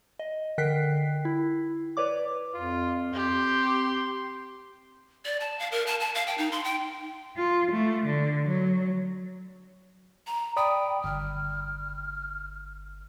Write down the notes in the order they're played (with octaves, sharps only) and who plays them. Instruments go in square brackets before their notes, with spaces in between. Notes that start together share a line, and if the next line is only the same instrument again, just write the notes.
[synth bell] D#5
D3 A#4 G5 F#6 B6 C7
E4
B4 C#5 D5 D6
[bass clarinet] F2 [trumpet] F4
[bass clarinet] C4 [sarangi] G4 [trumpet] C6
[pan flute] D5
A5
F5
A#4
A5
A5
F5
G5
D#4
C6
G5
[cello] F4
A3
D3
F#3
[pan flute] A#5
[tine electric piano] D5 B5 D#6 [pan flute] G5
[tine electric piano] G1 [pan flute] F6